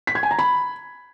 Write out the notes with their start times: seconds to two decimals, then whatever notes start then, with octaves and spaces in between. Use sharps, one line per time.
0.07 B6
0.15 G#6
0.23 G#5
0.31 A#5
0.39 B5